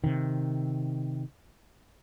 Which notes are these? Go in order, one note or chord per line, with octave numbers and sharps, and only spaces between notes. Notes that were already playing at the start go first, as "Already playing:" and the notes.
C3 D#3